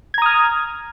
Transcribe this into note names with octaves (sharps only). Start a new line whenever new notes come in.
A#5 D#6 F6 G#6